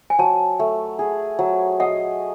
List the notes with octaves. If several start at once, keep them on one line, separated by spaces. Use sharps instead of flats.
G#5
F#3 A5
A3
G#4
F#3
D#5 F#5